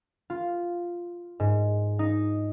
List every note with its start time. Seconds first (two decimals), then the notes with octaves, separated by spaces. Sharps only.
0.30 F4
1.40 G#2
1.99 D#4